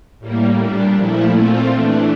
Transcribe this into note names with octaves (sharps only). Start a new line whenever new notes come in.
A2 G3 A#3
A#2 G3 D4
A#2 F3 A3 E4
A#2 A3 C4 F4
E3 A3 D4